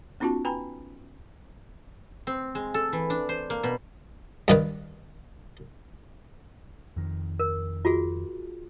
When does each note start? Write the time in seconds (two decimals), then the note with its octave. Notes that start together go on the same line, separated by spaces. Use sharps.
0.20 B3 C#4 D#4 F4 F#4 A5
0.45 B4 G5 G#5 A#5 B5
2.27 C4
2.55 G#3
2.74 A4
2.93 E3
3.10 D4
3.29 C5
3.50 A#3
3.63 B2
4.48 G2 D#3 B4
6.96 F2 D#3
7.40 A#4
7.85 F4 F#4 G#4